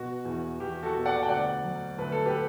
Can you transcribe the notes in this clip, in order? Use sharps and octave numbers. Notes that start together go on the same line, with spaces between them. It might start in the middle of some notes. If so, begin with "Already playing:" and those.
Already playing: B2 F#4
E2
E2 G4
F#4 A4
B2
D5 F#5
G5
D2 D5 F#5
F#3
D2 B4
A4
G4 B4